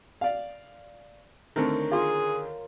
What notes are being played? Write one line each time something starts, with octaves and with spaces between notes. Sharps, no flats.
D5 F5
D3 D#3 A3 C4 A#4 C#5
F4 G#4 C6